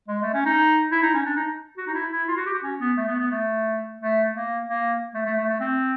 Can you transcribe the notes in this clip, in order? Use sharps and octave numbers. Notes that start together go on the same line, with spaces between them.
G#3
A3
C#4
D#4
E4
D#4
C#4
D4
D#4
F#4
D#4
E4
E4
F4
F#4
G4
F#4
C#4
B3
A3
B3
B3
A3
A3
A#3
A#3
A3
A3
A3
A3
C4